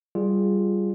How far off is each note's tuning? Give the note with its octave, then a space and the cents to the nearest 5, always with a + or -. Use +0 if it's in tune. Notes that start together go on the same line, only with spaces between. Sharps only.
G3 +0 F4 +0 G#4 +0